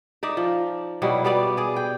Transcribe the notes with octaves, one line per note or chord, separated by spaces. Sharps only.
D#4 D5 E5
F3
B2 F#3 G3 E4
G3 B3 D5
G#4 D5
G5